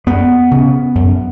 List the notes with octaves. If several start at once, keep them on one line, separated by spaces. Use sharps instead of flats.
F#2 B3
C#3
F#2